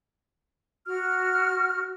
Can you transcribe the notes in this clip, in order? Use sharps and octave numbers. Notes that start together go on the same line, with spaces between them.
F#4 F6